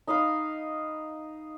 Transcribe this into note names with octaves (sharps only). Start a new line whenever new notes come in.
D#4 D#5 F5 B5